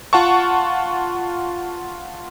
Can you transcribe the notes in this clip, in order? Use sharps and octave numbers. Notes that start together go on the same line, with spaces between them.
F4 F#5 A5 C#6